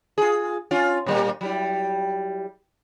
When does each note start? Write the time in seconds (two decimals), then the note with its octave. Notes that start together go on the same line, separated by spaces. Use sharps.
0.18 F4 G#4
0.71 C#4 F4
1.06 A#2 G3 A#3
1.41 F#3 G3 E4